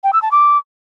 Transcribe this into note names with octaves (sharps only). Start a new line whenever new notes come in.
G5
E6
A5
D6